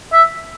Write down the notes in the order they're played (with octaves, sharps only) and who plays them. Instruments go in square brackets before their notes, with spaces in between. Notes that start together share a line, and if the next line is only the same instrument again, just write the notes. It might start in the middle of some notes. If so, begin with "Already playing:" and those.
[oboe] E5